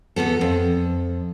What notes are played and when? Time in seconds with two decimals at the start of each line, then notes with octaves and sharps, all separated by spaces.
0.16 E2 G2 B3 A4
0.41 F2